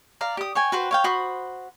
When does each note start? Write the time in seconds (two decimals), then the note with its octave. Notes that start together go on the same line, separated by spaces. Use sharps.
0.21 D5 F5 A#5
0.37 G4 D#6
0.55 C#5 G5 G#5
0.72 F#4 B4 C5 G5
0.91 C#5 F5 G5
1.04 F#4 C5 B5 D#6